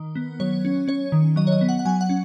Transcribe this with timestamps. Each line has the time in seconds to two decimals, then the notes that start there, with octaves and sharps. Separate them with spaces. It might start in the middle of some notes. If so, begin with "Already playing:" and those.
Already playing: D#3
0.15 B3
0.40 F#3 C#5
0.65 C#4
0.88 C#4 C#5
1.12 D#3
1.36 F#3 D#5
1.47 C#5
1.52 D#5
1.61 B3
1.69 F#5
1.79 F#5
1.85 F#3 G#5
2.01 F#5
2.09 C#4